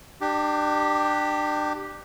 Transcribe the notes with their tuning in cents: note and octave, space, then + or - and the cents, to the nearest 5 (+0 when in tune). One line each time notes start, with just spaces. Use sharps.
D4 +30 G4 +0